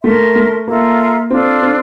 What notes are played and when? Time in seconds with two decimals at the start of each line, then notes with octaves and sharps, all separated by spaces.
0.04 A3 A#4 E5 A5 C6
0.36 A3
0.67 A#3 F4 A4 E5 A#5
1.30 C4 D4 F4 A4
1.62 C4